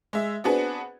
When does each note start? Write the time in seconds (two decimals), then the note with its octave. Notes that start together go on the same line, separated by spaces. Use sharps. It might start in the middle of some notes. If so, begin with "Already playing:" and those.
0.13 G#3 E5
0.44 B3 C4 D4 F#4 G#4 B4